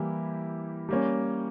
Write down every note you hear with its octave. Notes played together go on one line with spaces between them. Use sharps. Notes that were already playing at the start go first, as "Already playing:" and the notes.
Already playing: E3 G3 A#3 E4 G4
G3 A#3 C#4